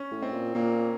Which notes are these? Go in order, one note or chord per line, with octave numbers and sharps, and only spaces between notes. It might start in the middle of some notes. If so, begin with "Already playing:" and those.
Already playing: C#4
A2
C4
A#2
A#2 A#3